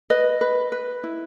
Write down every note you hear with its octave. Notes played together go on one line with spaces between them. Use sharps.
B4 D#5
B4
B4
E4